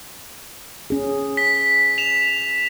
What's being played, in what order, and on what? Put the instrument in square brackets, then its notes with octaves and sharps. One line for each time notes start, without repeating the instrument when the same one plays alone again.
[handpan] C#4 G#4
[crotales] B6
E7 F7